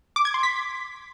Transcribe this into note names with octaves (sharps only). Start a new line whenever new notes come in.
D6
G#6
C6
B6